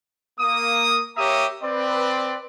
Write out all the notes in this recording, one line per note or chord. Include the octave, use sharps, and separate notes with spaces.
A#3 D#6
A#3 G4 C#5 E5 A#5 D#6
C4 B4 D5